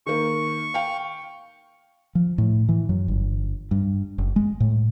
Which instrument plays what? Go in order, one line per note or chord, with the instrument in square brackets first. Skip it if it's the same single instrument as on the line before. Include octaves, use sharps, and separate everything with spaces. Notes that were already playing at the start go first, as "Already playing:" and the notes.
[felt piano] D#3 A#3 [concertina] C#6
[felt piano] F5 G5
[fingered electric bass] F3
A2
E3
F#2
G1
G2
F#1
G#3
A2